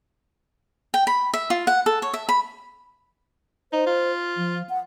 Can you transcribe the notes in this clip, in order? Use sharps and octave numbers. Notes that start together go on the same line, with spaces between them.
G5
B5
E5
F4
F#5
A4
C#5
E5
B5
D#4 C5
F4
F3
F#5